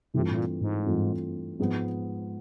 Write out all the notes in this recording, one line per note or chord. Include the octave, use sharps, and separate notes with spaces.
G2 C3 E3 A3 C4 F4
A2
A#2
G#2
G2 E3 A3 C4 F4
G#2 F3 G#3 B3